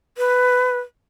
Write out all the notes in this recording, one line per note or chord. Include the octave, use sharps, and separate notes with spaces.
B4